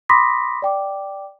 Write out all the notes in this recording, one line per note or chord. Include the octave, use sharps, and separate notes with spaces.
B5 C6 D6 D#6 A#6 B6
D5 G5 D6